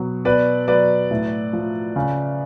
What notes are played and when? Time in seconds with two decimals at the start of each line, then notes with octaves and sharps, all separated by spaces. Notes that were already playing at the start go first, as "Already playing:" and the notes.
Already playing: B2 F#3
0.25 B2 B4 D5
0.68 F#3 B4 D5
1.11 A2
1.53 F3
1.96 C#3